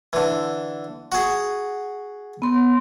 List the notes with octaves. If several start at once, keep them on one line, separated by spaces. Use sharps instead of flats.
D3 E3
F#4 G#4
B3 C6